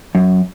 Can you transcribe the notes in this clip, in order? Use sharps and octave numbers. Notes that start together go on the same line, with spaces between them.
F#2